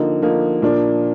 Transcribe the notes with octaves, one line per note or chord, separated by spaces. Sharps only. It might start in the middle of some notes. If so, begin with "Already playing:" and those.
Already playing: D3 F3 A#3 D#4
D3 F3 A#3 D#4
A#2 F3 A#3 D4